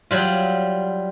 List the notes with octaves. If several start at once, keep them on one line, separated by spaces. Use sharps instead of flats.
F#3 G3 F4